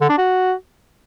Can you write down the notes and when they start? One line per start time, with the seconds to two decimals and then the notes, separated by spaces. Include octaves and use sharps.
0.01 D3
0.09 D4
0.18 F#4